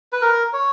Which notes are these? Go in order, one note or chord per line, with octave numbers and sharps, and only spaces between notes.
B4
A#4
C#5